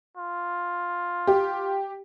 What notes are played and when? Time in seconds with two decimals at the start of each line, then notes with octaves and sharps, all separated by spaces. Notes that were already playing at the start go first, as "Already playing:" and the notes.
0.17 F4
1.27 G4